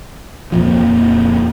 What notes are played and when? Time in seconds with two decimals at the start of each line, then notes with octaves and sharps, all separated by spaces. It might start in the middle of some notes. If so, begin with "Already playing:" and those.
0.52 D#1 F2 A#2 F3